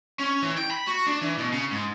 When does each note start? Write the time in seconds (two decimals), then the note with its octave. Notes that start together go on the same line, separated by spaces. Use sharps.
0.19 C#4
0.42 E3
0.58 G5
0.71 B5
0.87 F#4
1.07 D4
1.21 E3
1.38 B2
1.52 C#3
1.71 G#2